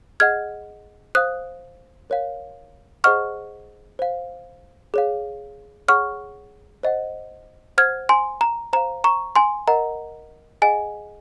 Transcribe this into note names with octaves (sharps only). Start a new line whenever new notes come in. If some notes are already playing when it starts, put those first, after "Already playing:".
G#4 D#5 F#5 F6 G#6
C5 F5 D#6 F#6
A#4 C#5 F5
G#4 C5 D#5 F#5 C#6 F6
C5 F5
G#4 C#5 F5
G#4 C#5 F#5 C#6 F6
C5 D#5 F#5
C5 F#5 F6 G#6
G#5 C6
A#5
C5 F5 A#5
A#5 C#6
G#5 C6
A#4 D#5 F#5 A#5
G#4 D#5 F#5 G#5